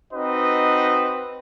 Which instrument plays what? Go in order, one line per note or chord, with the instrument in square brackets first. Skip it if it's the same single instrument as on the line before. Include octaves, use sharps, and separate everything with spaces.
[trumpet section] C4 D#4 F#4 B4 D#5